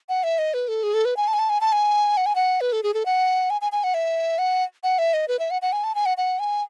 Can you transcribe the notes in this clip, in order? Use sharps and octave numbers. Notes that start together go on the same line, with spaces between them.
F#5
E5
D#5
B4
A4
G#4
A4
B4
G#5
A5
G#5
A5
G#5
A5
G#5
F#5
G#5
F#5
B4
A4
G#4
A4
F#5
G#5
G#5
G#5
F#5
E5
F#5
F#5
E5
D#5
B4
E5
F#5
F#5
G#5
A5
G#5
F#5
F#5
G#5